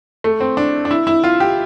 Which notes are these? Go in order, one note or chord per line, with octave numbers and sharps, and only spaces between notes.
A3
C4
D4
D4
E4
E4
F4
G4